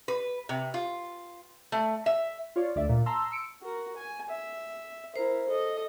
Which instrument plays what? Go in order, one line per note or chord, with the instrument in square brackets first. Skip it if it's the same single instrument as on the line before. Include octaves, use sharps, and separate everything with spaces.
[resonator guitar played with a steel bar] B4
C3
F4
A3
E5
[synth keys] F4 C#5 D5
D2 D5 E5
A#2
A5 A#5 C6 E6
E6 C#7 D7
[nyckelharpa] F#4 A#4
G#5
E5
[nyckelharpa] E4 A#4 [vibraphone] C5
[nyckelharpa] A4 D#5